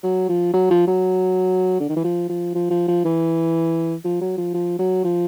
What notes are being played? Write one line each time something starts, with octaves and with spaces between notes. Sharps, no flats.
F#3
F3
F#3
F3
F#3
D3
D#3
E3
F3
F3
F3
F3
F3
E3
F3
F#3
F3
F3
F#3
F3